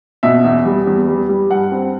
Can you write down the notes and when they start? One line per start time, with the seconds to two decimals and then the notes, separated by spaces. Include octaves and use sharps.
0.23 B2 E5
0.44 E2
0.65 G3
0.87 E2
1.08 G3
1.29 G3
1.50 G2 F#5
1.72 C4